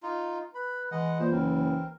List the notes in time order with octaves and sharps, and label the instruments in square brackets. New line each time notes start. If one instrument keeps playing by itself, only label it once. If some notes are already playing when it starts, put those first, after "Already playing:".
[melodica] D#4 F4
[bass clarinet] B4 [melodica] B5
[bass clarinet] E3 [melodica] G#3 D#5 F#5
[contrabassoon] A#2 [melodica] C5
[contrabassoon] F#1 [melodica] C4 A#4